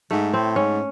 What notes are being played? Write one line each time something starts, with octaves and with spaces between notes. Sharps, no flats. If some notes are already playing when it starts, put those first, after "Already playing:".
G#2 A3
A2 C4
G#2 C#4